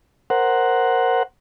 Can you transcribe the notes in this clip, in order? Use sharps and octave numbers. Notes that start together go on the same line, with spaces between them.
A#4 C5 F#5